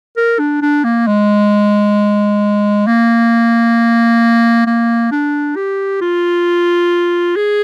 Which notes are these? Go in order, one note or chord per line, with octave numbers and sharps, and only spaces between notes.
A#4
D4
D4
A#3
G#3
A#3
A#3
D4
G4
F4
G#4